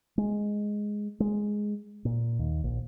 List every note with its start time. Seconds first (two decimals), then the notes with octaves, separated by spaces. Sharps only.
0.18 G#3
1.20 G#3
2.05 A#2
2.39 D#2
2.64 A#1